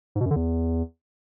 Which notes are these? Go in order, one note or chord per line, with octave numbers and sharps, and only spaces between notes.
G#2
B2
F#2
D3
E2